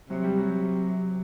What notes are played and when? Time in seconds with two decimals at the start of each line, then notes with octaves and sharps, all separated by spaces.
0.09 C3 F#3
0.24 G3
0.37 F#3